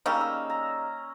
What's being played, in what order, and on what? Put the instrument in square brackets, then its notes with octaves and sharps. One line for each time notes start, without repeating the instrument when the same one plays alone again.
[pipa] C#3 G3 D#4 [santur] A#3 C#4 E6
[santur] E6
A#5